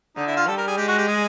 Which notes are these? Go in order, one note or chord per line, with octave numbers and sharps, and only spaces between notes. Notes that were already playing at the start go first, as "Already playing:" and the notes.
D3 D#4
E4
F4
G3 A4
A#4
G#4
G#3 G4
F#4
G4
G#4